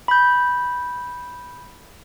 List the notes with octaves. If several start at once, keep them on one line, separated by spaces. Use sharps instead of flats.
B5 G6